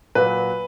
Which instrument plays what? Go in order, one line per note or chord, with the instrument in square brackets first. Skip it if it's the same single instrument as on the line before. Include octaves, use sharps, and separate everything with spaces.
[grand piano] A#2 F#3 B4